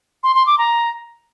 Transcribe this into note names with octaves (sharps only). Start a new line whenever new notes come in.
C6
C6
D6
A#5